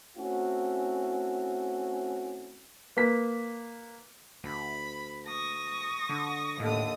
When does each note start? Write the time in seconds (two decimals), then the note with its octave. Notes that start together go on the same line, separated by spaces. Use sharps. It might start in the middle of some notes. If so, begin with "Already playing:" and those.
0.17 A3 C4 C#4 E4 F#4
2.97 A#3 B4 B6
4.44 D2 B5
5.25 C#6 D#6 A#6
6.09 D3
6.59 D#2 A2 D3 D#6